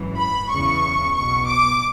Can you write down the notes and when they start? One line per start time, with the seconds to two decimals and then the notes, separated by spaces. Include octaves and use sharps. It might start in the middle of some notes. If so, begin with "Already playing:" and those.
Already playing: G#1 F#2 E3
0.18 B5
0.51 E2 C#3 E3 C#6
1.15 B1 B2 C#6
1.48 D6